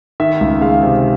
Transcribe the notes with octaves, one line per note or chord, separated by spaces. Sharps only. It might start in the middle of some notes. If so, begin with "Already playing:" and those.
D#3 E5
C#2
G#3 F5
C3